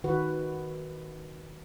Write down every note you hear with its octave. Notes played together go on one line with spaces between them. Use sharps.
D#3 F#4 B4